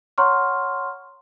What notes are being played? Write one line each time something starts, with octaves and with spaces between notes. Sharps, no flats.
C#5 F#5 A#5 C6 C#6 F6